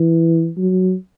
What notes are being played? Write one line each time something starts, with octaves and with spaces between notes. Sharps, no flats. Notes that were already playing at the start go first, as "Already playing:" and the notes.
Already playing: E3
F#3